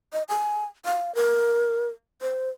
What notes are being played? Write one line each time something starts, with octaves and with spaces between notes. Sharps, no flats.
D#5
G#5
F5
A#4
C5